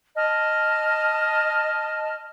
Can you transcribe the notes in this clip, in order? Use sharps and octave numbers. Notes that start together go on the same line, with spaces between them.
D#5 A5 F6